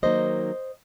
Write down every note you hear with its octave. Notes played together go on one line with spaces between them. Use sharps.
D#3 F#3 A#3 D#4 C5 D#5